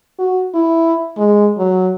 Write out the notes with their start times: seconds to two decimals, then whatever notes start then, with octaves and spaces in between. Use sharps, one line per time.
0.19 F#4
0.54 E4
1.17 G#3
1.57 F#3